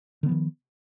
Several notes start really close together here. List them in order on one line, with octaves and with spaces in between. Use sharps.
D3 B3 F3 D#3